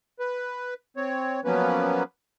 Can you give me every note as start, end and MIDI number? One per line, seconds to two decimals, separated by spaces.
0.20 0.74 71
0.97 1.40 60
0.97 1.40 73
1.45 2.03 53
1.45 2.03 54
1.45 2.03 58
1.45 2.03 59
1.45 2.03 61
1.45 2.03 71